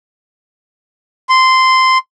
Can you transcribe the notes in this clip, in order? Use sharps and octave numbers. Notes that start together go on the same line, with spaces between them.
C6